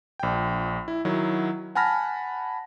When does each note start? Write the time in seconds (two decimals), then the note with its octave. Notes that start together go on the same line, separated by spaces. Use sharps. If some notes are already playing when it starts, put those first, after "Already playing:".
0.19 A#1 G5
0.88 E4
1.05 D#3 F#3 E4
1.75 F#5 G#5 A5 B5 F6 A#6